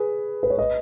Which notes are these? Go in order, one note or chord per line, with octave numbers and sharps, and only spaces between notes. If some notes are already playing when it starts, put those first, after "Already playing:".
Already playing: G#4 B4
B4
C#5
B4 D#5